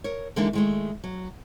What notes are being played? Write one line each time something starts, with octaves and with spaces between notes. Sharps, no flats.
A#4 C#5
D3 E3 G#3 A#3 D4 D#4
D#3 G#3 A3
F#3